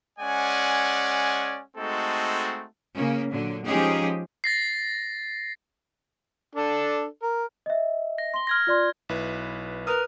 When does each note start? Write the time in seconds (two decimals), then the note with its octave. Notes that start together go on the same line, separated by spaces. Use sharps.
0.19 G#3 C#4 D5 F#5 G#5
1.77 G#3 A3 C4 D#4 F#4 A4
2.93 C#3 A#3 C#4
3.30 A#2 D3 F#3
3.65 F3 G#3 C#4 D#4 G4 G#4
4.44 A6 A#6 C7
6.55 D4 A4
7.22 A#4
7.66 D#5 E5
8.18 A#6
8.34 C6 G7
8.47 F6 G#6 A#6
8.67 F4 D5 C6
9.09 B1 E4 B4
9.87 A#4 B4 D#6